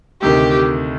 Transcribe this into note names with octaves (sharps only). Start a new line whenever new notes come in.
D2 C3 D#3 G4